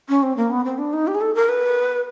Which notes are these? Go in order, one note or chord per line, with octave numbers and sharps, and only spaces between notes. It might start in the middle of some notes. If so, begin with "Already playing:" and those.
C#4
C4
A#3
B3
C4
D4
D#4
G4
G#4
A4
A#4
B4